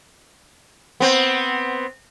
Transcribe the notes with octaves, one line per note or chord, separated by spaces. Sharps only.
B3 C4